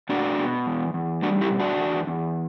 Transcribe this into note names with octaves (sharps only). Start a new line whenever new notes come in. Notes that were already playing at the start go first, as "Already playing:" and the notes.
B2 D4 F#4
B2
E2
E2
G3 D4 F#4
E4 G4
B2
D4 F#4
E2
E2